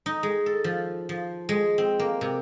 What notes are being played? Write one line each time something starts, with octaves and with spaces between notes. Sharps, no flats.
D#4
G#3
A4
F3
F3
G#3
C4
A#3
C3